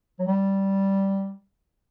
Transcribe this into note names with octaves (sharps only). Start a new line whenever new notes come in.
F#3
G3